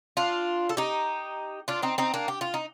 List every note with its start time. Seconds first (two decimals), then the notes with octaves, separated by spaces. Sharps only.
0.17 D4 F4
0.69 A4
0.77 D#4 G4
1.68 D4 F4
1.82 C4 D#4
1.98 C4 D#4
2.14 A#3 D4
2.28 G4
2.41 F4
2.54 D#4